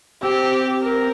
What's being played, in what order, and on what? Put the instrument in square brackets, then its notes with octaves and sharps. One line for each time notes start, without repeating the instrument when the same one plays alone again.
[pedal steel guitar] C4 [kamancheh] G4
[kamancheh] A#4